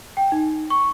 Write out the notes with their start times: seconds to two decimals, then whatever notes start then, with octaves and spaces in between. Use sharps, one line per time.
0.17 G5
0.32 D#4
0.70 C#6